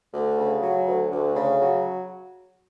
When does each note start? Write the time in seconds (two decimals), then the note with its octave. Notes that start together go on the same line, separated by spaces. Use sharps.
0.13 D2
0.38 C#3
0.62 F#3
0.87 D2
1.11 D2
1.36 C#3
1.60 F#3